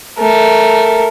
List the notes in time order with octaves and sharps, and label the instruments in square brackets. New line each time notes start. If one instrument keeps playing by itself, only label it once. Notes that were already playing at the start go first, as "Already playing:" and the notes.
[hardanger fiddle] A3 A#4